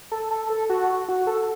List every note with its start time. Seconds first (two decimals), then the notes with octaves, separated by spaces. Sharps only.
0.12 A4
0.31 A4
0.50 A4
0.70 F#4
1.09 F#4
1.27 A4